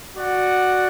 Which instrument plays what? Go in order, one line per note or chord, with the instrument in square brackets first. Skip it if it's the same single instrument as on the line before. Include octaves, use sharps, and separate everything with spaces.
[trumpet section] F#4 D5 F#5